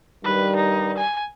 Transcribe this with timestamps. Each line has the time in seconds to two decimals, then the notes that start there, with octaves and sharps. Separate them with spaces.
0.24 G2 D#3 G3 B4
0.56 D#4
0.98 G#5